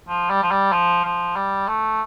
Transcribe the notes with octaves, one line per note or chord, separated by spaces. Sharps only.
F3
G3
F3
G3
F3
F3
G3
A3